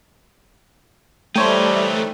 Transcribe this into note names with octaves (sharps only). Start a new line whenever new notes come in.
E3 G3 A3 D#4 C5 C#5 G5